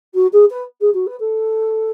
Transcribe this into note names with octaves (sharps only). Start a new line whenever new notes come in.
F#4
G#4
B4
G#4
F#4
B4
A4